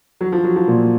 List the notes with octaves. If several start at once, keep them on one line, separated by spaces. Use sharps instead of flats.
F#3
F3
F#3
F3
A#2